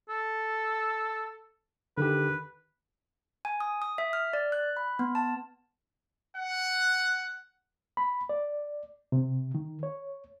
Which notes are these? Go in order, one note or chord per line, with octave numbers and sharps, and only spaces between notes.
A4
D3 D#3 G4 B4
G#5
D#6
D#6
E5
F6
D5
F#6
B5
B3
A5
F#5
B5
D5
C3
D#3
C#5